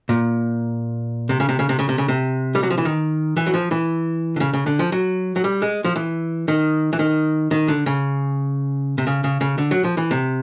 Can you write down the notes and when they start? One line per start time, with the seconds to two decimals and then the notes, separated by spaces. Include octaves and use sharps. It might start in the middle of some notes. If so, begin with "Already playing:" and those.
0.09 A#2
1.29 C3
1.40 C#3
1.49 C3
1.59 C#3
1.69 C3
1.79 C#3
1.89 C3
1.98 C#3
2.08 C3
2.55 G3
2.63 F#3
2.70 F3
2.78 E3
2.85 D#3
3.37 E3
3.46 F#3
3.54 F3
3.71 E3
4.36 D3
4.40 C#3
4.53 C#3
4.66 D3
4.79 F3
4.92 F#3
5.36 F#3
5.44 G3
5.62 G#3
5.84 F3
5.96 E3
6.48 D#3
6.93 E3
6.99 D#3
7.51 D#3
7.68 D3
7.86 C#3
8.98 C3
9.07 C#3
9.24 C#3
9.41 C#3
9.58 D3
9.71 F#3
9.84 F3
9.97 E3
10.11 C3